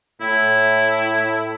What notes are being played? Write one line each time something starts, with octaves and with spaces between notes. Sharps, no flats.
A2 E4